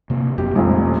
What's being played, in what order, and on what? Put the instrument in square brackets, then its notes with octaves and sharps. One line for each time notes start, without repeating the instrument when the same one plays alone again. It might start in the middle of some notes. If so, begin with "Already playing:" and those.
[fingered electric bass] C3 A#3
[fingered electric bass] F#1 F#2 B2 [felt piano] G4
[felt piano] F1 A#1 [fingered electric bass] G#3
[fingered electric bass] B1